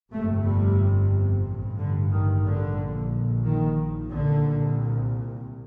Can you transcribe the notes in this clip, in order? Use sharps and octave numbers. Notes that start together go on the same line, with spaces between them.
G1 F2 C3 A3
G3
A1 G2
D3
D#3
D3
A#1 A#2
D#3
C2 A#2 D3